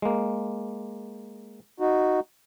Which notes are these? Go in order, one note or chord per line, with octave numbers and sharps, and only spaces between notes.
G#3 A#3
D#4 F#4